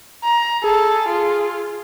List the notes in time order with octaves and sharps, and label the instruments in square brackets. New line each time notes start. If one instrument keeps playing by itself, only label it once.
[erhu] A#5
[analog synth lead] G#4 [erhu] A4
[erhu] F4